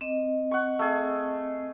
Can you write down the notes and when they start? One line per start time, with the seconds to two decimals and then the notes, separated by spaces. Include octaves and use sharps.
0.01 C4 D#5
0.51 F#5 C#6
0.79 A3 G#4